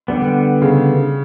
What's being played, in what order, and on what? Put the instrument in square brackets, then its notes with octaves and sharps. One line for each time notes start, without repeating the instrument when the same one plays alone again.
[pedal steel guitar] D3 G3 B3
[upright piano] C#3